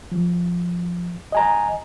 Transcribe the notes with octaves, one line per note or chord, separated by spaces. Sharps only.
F3
D#5 G#5 A#5